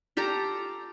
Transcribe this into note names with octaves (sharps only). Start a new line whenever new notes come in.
F4 G4 A4 A#5